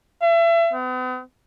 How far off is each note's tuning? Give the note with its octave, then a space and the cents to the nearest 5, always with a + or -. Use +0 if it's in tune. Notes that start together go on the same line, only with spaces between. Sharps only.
E5 +35
B3 +45